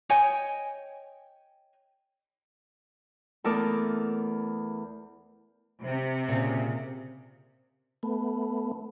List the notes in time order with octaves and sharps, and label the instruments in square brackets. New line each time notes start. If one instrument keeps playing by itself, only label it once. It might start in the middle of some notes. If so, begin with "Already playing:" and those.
[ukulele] C#5 D#5 G5 G#5
[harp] E2 A3 A4 A#4 D6 D#6
[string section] C3
[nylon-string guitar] A#2 C#3
[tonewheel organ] A3 B3